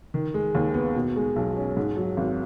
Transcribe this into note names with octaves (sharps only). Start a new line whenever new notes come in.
D#3
G#3
D#2
B3
B2
G#3
B1
C#4
G#2
F#3
G#1